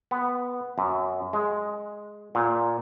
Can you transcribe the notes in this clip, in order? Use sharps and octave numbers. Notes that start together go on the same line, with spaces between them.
B3
F#2
G#3
A#2